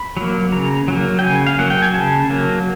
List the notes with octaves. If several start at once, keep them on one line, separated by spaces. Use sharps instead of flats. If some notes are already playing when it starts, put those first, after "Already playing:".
Already playing: B5
F#3 A#3
C#3 A#5
F#3 A#3
G5
C#3 G#5
F5
F#3 A#3 F#5
G5
G#5
C#3 A5
F#3 A#3